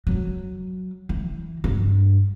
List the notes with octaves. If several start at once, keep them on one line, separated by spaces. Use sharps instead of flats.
F#3
E3
G2